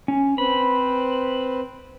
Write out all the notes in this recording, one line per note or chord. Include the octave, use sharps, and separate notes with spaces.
C#4
C4 B4 C5 B5